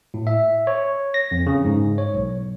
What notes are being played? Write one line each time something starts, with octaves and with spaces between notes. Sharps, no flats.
A2
E5
C#5
A#6
F2
C#3
G#2
C#5
B1